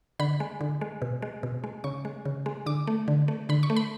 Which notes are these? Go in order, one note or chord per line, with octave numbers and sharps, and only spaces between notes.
D3 B5
G#3
D3
G#3
B2
G#3
B2
G#3
C#3 C#6
G#3
C#3
G#3
D3 D6
A3
D3
A3
D3 B5
C#6
A3
B5